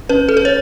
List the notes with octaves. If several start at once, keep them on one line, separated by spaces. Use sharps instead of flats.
C#4 B4
A4
B4
C#5